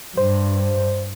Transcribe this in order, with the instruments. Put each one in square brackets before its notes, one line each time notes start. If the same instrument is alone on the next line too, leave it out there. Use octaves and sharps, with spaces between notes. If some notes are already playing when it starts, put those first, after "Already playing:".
[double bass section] G2 [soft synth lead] C5